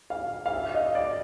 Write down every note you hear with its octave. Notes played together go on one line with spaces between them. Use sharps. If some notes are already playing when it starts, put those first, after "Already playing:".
F5
F5
E5
D#5
D5